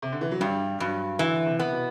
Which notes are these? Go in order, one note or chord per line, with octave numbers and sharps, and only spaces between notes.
C3
D3
E3
F#3
G2 G3
G2 F#3
D3 E3
C3
B3
B2